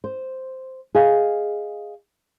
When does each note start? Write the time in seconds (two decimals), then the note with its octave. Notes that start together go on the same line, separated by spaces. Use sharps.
0.04 C5
0.95 G#4 D#5 F5 G#5